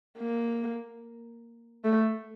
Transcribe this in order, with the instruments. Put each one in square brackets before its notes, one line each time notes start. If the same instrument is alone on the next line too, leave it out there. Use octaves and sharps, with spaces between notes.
[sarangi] A#3
A3